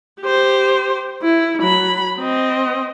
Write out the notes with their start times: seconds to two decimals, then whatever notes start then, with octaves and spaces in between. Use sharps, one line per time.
0.21 G4 C5
1.22 E4
1.62 F#3 B5
2.19 C4 D#5